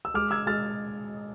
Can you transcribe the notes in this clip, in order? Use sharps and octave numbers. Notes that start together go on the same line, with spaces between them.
E6
G#3 D6 F6
E6 G#6
G#3 F6 A6